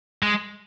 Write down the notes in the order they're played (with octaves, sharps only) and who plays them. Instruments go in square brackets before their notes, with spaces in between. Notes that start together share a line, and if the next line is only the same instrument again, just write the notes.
[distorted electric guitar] G#3